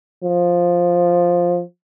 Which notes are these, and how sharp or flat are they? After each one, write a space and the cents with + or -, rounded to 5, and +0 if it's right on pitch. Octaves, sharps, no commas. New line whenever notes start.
F3 +5